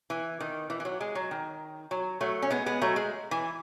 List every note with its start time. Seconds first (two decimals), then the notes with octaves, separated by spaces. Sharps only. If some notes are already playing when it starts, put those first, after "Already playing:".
0.10 E3
0.40 D#3
0.70 E3
0.80 E3
0.85 F#3
1.01 G#3
1.15 F#3
1.31 D#3
1.91 F#3
2.21 F#3 A3
2.42 C#4
2.50 G#3 B3
2.66 G#3 B3
2.81 F#3 A3
2.96 G#3
3.31 E3